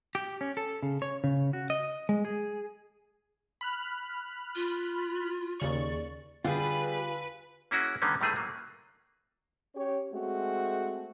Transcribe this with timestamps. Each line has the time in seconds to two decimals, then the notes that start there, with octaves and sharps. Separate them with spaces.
0.15 G4
0.41 C#4
0.57 A4
0.83 C#3
1.02 C#5
1.24 C#3
1.53 F#4
1.70 D#5
2.09 G#3
2.25 G#4
3.61 B5 F6 F#6
4.55 F4
5.60 D#2 C#3 D5 C#6
6.45 D3 G3 F4 G#4 B4
7.71 A#3 C#4 E4 F#4 G#4
8.02 D3 D#3 G3 A#3 B3 C#4
8.21 A2 D#3 G3 A3 G#4 B4
8.36 F#3 A#3
9.74 C#4 G4 C#5
10.12 G#3 A3 C4 F#4